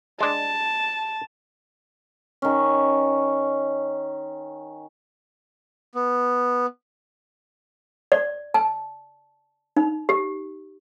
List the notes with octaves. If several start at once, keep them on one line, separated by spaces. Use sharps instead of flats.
G#3 D4 A5
D#3 C#4
B3
D5
A5
D#4
G4